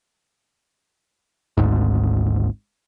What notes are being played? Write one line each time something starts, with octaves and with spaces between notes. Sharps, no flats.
G#1 D2 G#2